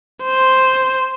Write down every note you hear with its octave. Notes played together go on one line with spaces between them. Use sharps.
C5